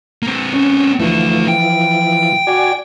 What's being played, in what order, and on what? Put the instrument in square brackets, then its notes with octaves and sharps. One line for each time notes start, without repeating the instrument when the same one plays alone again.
[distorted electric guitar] A#3 C4
[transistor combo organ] C#4
[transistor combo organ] E3 F3 [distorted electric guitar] A3 D4
[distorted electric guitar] G5
[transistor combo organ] F#4 D5 G#5